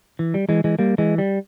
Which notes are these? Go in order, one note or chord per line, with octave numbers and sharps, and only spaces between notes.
E3
G3
E3 G#3
E3 G#3
G3 A#3
E3 G#3
G3